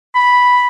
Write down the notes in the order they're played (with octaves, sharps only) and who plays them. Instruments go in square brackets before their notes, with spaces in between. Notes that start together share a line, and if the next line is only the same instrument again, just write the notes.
[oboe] B5